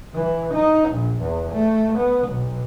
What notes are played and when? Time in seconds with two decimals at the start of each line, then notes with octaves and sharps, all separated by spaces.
0.14 E3
0.54 D#4
0.90 A#1
1.21 E2
1.53 A3
1.98 B3
2.28 B1